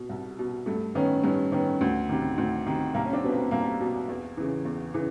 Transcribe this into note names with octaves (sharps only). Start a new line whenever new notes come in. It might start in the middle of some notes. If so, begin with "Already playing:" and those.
Already playing: B2
C2
B2
G2 A3
D#3 B3 C#4
G2 B3 C#4
D#3 B3 C#4
D2
C3 D#3
D2
C3 D#3
C2 A#3
C#4
C4 D4
B2 B3
A#3 C4
C2 A#3 C4
B2
E2
C#3 E3
E2
C#3 E3